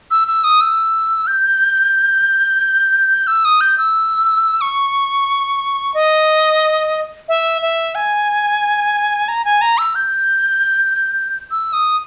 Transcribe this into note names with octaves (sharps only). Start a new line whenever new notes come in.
E6
E6
D#6
E6
G6
E6
D#6
G6
E6
C#6
D#5
E5
E5
G#5
A#5
G#5
A#5
E6
G6
E6
D#6